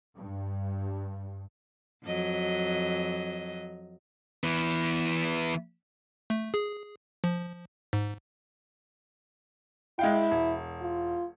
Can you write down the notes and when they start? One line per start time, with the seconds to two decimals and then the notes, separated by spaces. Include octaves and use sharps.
0.16 G2
2.05 F2 F#3 D#5
4.43 E3 B3
6.30 A3
6.54 G#4
7.24 F3
7.93 G#2
9.99 G#3 E4 F5 G5
10.31 E1
10.81 F4